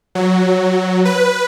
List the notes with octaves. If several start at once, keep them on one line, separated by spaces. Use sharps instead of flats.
F#3
B4